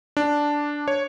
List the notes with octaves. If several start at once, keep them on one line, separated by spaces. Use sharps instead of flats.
D4
C#5